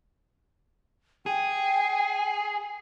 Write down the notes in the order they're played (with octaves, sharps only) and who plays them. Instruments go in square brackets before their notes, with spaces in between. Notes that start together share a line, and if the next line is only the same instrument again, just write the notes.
[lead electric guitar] G#4 [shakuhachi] G5